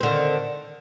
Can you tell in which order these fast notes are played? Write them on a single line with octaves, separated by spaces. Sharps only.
C4 D3 D#3